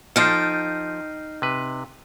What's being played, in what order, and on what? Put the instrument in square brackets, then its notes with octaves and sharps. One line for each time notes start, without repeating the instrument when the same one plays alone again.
[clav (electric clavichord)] F3 A4 [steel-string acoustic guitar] D#4 G5 [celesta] F6 C7
[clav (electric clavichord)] C3 B4